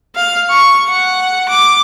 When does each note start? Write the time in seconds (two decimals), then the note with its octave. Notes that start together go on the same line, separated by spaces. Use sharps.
0.16 F5
0.50 C#6
0.89 F#5
1.49 D6